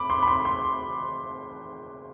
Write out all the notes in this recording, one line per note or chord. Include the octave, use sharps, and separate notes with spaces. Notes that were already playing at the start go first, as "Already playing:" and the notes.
Already playing: B5 D6
C6
B5
C6
C6